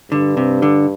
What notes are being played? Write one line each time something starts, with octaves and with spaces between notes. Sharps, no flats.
G2 D3
C3
D3